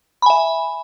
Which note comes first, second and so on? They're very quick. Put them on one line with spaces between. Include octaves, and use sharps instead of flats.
B5 G#5 E5